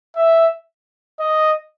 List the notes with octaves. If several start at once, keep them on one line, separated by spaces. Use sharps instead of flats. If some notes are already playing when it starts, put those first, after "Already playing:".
E5
D#5